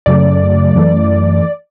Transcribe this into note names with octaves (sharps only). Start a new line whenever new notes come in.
F#2 C#3 F#3 A3 D5
F#2 E3 A3